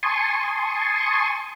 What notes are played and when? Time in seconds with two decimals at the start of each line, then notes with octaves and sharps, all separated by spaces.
0.03 G#5 A5 C6 C#6 D#6